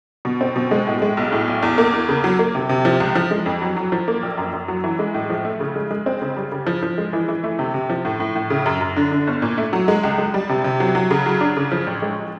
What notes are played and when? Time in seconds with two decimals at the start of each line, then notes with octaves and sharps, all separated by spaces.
0.25 B2
0.41 C4
0.56 B2
0.71 G#3
0.87 A2
1.02 G#3
1.17 B1
1.32 A2
1.47 B1
1.63 E2
1.78 A#3
1.93 E2
2.09 C#3
2.24 F#3
2.39 A#3
2.55 C3
2.69 C3
2.85 F3
3.00 C#2
3.15 F3
3.31 G#3
3.46 F2
3.62 F#3
3.76 F#3
3.92 F3
4.08 A#3
4.23 A#1
4.38 F#2
4.53 F#2
4.68 F#3
4.84 E3
4.99 G#3
5.14 A2
5.30 F3
5.45 A3
5.60 C#3
5.76 G#3
5.91 G#3
6.06 C4
6.21 C#3
6.37 G3
6.52 C#3
6.67 F3
6.83 F3
6.98 G#3
7.13 E3
7.28 E3
7.44 A3
7.59 C3
7.74 C3
7.90 F3
8.05 A2
8.20 A2
8.35 A2
8.50 C#3
8.66 F#2
8.81 F#2
8.96 D3
9.12 D3
9.27 G1
9.42 A#2
9.58 A3
9.73 F#3
9.88 G#3
10.04 C#2
10.18 G#3
10.34 G3
10.49 C3
10.64 C3
10.80 F#3
10.95 F#3
11.11 C#3
11.26 F#3
11.41 D4
11.56 C#3
11.72 F3
11.87 A1
12.02 G#3